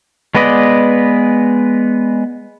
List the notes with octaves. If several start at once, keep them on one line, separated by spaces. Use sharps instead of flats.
G#3 B3 B4 D5 D#5